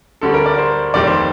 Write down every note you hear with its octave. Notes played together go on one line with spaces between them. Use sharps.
D2 D3 G3 A4
A#4
D5
A#4
C5
F1 D#2 D#3 G3 D5
C5